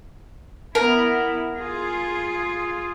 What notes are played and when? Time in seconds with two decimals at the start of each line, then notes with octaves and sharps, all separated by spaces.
0.75 B3 E4 A#4
1.55 F4 G#4